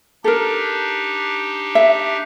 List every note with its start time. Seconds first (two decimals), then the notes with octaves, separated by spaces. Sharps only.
0.24 D4 D#4 G4 A4 A#4
1.75 E5